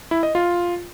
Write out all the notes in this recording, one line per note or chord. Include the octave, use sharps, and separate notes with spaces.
E4
D#5
F4